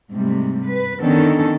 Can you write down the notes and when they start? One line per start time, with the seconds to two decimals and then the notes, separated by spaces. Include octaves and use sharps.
0.13 G#2 C3 G3 A3
0.66 B4
1.00 D3 D#3 B3 C#4 D4 A4